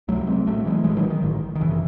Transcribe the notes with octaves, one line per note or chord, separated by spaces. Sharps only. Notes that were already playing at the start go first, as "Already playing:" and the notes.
C#2 C3 F#3 A3
G#3 C4
A1 A2 F#3 A3
E3 G#3
A1 A2 E3 G#3
D#3 F#3
D#3
A1 G#2
D#3
G#1 F#2 C#3 E3